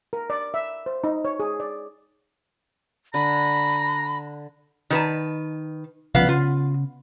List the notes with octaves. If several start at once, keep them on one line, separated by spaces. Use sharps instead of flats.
A#4
D5
E5
C5
D#4
C#5
G#4
D5
D3 A#5 B5
D#3 B4 A5
C2 C#3 F3 B3 F5
C#3 F4